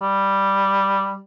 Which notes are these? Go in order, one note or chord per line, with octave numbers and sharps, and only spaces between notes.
G3